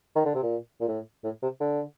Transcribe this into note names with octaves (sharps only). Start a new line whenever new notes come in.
D#3
D3
C3
A#2
A#2
A2
A2
C3
D3